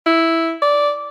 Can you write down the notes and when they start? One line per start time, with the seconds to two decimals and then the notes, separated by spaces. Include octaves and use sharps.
0.06 E4
0.62 D5